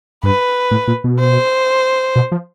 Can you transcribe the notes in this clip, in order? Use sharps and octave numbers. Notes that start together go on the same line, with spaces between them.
G2 B4
A2
A#2
B2
C5
B2
F3